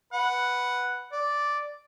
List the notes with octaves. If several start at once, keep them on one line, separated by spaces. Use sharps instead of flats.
B4 F#5
D5